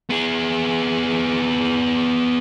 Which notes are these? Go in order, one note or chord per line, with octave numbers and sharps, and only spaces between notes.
B3 G#4